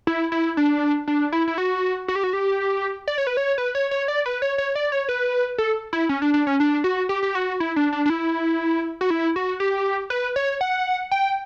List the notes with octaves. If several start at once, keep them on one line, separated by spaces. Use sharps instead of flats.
E4
E4
D4
D4
E4
E4
F#4
F#4
G4
F#4
G4
D5
C#5
B4
C#5
B4
C#5
C#5
D5
B4
C#5
C#5
D5
C#5
B4
A4
E4
C#4
D4
D4
C#4
D4
F#4
G4
G4
F#4
E4
D4
D4
D4
E4
F#4
E4
F#4
G4
B4
C#5
F#5
G5